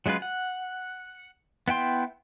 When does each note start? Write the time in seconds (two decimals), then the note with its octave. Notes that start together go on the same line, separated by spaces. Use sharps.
0.06 F#3 G#3 C#4 F4 B4
0.22 F#5
1.68 B3 E4 G5 C6